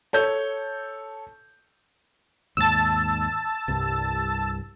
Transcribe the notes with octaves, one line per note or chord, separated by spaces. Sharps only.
A4 C#5 G6
D#2 G#2 A5 E6
C2 G2 G3